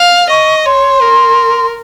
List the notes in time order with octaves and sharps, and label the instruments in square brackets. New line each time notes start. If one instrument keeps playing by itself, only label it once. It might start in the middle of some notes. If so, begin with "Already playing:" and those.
Already playing: [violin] F5
[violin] D#5 [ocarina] C#6
[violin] C#5 [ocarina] C6
[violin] A#4